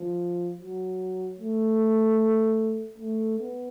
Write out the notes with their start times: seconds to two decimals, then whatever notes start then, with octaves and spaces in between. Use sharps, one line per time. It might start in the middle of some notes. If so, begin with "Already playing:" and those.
Already playing: F3
0.59 F#3
1.39 A3
2.98 A3
3.39 B3